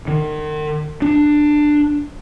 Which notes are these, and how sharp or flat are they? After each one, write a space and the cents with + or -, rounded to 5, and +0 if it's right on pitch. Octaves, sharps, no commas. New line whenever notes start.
D#3 -40
D4 +15